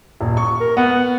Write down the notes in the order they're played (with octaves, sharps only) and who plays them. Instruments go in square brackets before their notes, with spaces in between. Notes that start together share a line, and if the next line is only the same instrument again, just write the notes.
[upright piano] D#1
C#6
[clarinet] A#4
[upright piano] B3 [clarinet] F#5